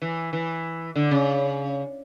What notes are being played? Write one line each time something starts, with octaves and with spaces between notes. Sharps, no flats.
E3
E3
D3
C#3